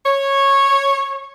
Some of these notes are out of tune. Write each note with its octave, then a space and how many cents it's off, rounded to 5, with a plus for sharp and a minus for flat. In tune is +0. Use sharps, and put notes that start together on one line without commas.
C#5 -10